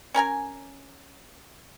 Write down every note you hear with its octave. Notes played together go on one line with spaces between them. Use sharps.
C#4 A#4 G#5 A#5